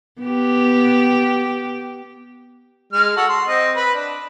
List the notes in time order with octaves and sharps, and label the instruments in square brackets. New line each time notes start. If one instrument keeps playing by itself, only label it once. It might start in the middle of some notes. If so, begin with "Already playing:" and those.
[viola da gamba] B3 G4
[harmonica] G#3 F6
F#4 A4 F#5
C6
C4 D#5
B4
D4